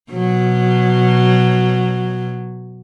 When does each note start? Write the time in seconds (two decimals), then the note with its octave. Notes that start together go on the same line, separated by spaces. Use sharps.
0.12 B2 F#3